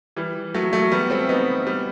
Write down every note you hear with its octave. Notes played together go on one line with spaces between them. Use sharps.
E3 G3
F#3 A3
F#3 A3
G3 B3
A3 C4
B3 D#4
G3 B3